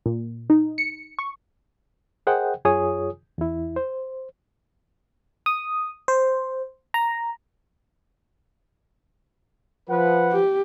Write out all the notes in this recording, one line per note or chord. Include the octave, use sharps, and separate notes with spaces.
A#2
D#4
C#7
C#6
G#4 A#4 C5 D#5 F#5 G5
F#2 F4 G#4 C#5 G#5 D#6
E2 E4
C5
D#6
C5
A#5
F3 B4 F#5
G4